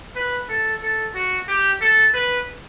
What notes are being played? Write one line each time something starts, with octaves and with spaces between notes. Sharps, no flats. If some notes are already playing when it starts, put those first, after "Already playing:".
B4
A4
A4
F#4
G4
A4
B4